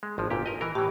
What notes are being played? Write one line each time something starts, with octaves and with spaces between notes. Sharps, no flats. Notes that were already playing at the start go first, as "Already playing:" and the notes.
G#3
G#1 F3
G1 A#2 G4
A#4 D#5
E3 A#4
A2 E3 G4